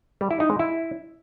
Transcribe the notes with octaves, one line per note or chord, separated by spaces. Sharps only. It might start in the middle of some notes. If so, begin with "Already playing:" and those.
G3
E4
D#4
G#3
E4